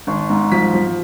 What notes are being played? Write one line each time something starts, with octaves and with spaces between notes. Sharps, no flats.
G#1
G#2
F3 B6
F3